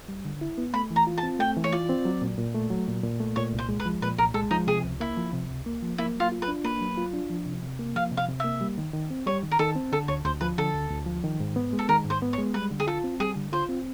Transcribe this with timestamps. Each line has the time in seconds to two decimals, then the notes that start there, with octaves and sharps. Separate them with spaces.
0.09 G3
0.25 D3
0.41 E4
0.58 B3
0.74 A3 B5
0.91 E3
0.96 A#5
1.07 F4
1.18 A5
1.23 C4
1.39 A3 G5
1.57 E3
1.64 C#5
1.72 F4 D5
1.89 C4
2.05 F#3
2.22 A#2
2.38 A#2
2.55 A3
2.70 F#3
2.87 A#2
3.04 A#2
3.20 A3
3.36 A#2 C#5
3.53 C2
3.59 C5
3.69 G#3
3.80 B4
3.86 F3
4.02 A#2 B4
4.18 C2 A#4
4.34 G#3 A4
4.51 F3 D#4
4.67 C3 G#4
4.83 C#2
5.00 A#3 E4
5.17 F3
5.33 C3
5.50 C#2
5.66 A#3
5.82 F3
5.98 A#3 E4
6.15 F#3 F4
6.32 F4
6.42 B4
6.48 D4
6.64 A#3 B4
6.81 F#3
6.98 F4
7.13 D4
7.30 F3
7.46 C3
7.63 C3
7.79 A#3
7.95 F3 F5
8.11 C3
8.17 F5
8.28 C3
8.40 A#3 E5
8.61 G3
8.78 D#3
8.93 D#3
9.11 C4
9.27 G3 C#5
9.43 D#3
9.51 A#4
9.59 D#3 A4
9.76 C4
9.92 D3 A4
10.08 D2 C#5
10.25 D2 C5
10.41 F3 B4
10.58 D3 A4
10.74 D2
10.90 D2
11.06 F3
11.24 D#3
11.40 G#2
11.56 B3
11.73 G#3
11.79 A4
11.89 D#3 A#4
12.05 G#2 C5
12.22 B3
12.33 C#5
12.38 G#3
12.54 G3 B4
12.71 D3
12.80 G#4
12.87 F4 A4
13.04 C4
13.20 G3 G#4
13.36 D3
13.52 F4 C5
13.69 C4